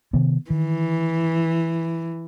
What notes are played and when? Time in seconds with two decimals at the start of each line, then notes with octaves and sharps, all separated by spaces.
0.13 C3 D#3 B3
0.50 D#3 E3